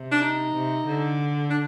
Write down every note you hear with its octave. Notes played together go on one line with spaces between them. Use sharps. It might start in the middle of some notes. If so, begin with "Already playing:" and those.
Already playing: C3
D4
D#4
C3
D3
D4